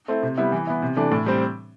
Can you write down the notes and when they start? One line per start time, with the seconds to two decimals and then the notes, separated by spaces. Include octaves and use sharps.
0.08 A3 C4 E4
0.23 C3
0.38 G3 B3 E4
0.52 E3
0.67 B3 E4
0.82 C3
0.96 E3 A3 D4
1.12 A2
1.26 G3 C4